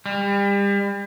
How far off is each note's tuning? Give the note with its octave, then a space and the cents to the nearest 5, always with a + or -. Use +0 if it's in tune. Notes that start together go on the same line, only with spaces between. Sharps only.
G3 +35